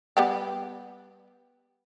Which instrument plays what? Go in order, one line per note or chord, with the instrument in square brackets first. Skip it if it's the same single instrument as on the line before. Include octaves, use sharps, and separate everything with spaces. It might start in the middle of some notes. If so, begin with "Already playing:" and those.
[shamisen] G3 B3 G4